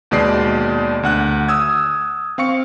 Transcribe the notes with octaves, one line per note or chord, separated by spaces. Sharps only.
D#2 B2 G#3 D5 C7
D2 F#5 F#6
D#6 E6 G#6
C4 F5 C#6 C#7